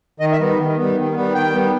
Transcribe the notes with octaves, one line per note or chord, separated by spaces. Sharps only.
D#3 D#5
E5
G3 B3
D#3
G3 B3
D#3
G3 B3
D#3 G5
G3 B3